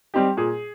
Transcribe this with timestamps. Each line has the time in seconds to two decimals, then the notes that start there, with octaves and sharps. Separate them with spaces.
0.14 G3 C4 D#4 G4
0.37 A#2 G#4